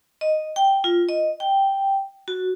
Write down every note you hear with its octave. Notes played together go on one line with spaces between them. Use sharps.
D#5
G5
F4
D#5
G5
F#4